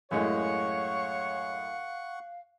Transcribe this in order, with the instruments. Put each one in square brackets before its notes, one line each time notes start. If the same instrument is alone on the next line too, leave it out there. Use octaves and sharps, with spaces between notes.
[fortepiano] F#2 A2 G#3 [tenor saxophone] C#5 [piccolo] F5 [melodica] F#5 C#6